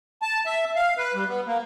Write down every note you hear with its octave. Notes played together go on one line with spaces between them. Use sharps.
A5
E5
F5
B4
G3
B3
A#3